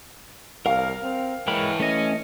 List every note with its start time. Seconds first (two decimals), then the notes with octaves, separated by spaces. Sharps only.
0.66 C2 A#4 F5
1.03 C4
1.48 E3 G#3 A#4 C#5 G5 B5
1.80 A3 C#4 D#5